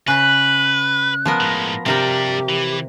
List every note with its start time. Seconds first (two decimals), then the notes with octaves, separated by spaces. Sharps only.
0.08 C#3 B4 F#6
1.25 F3 B3 A#4
1.40 A2 G#3
1.86 C3 G3 D4 G4 A#4 G5
2.49 E3